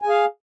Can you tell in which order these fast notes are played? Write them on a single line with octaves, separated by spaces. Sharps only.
G#5 G#4 F5